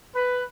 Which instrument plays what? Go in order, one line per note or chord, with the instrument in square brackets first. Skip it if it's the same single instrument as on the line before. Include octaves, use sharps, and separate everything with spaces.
[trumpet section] B4